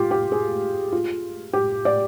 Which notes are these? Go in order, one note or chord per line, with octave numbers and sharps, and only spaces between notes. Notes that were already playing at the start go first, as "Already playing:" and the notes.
Already playing: F4 G4
G4
G#4
F4
G4
D5